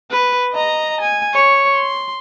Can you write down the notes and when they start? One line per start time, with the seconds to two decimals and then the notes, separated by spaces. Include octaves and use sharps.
0.10 B4
0.53 D#5 A#5
1.01 G#5
1.33 C#5
1.74 C6